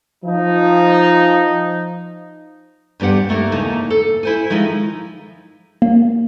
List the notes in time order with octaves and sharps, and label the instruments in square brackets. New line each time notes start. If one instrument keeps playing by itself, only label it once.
[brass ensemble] F3 D#4
[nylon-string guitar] E2 G2 B3 G4 F#5
D#2 A3 A#3 D#4
E2 C#3 A#3 D#4 E4 A5
A4
E4 C5 G#5
D#3 F3 G#3 D#4 E4
[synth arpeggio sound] A#3